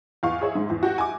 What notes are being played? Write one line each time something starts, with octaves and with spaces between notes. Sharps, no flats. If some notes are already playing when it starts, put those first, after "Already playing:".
E2 F5 C#6
G#4 C#5 E5
G#2
E2
F#4 G4
G#5 D6